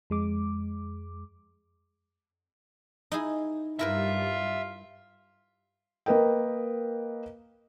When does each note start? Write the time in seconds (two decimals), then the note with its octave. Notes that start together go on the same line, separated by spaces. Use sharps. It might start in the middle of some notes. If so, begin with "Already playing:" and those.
0.10 F2 G#3 D6
3.12 D#4 E4 G#4
3.79 G2 G3 E4 F4 A#4 B4 E5
6.06 A#3 A#4 B4 D#5 G5